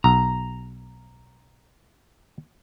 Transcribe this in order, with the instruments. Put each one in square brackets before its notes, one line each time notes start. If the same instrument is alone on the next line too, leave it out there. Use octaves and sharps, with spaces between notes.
[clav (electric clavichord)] B1 [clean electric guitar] A#5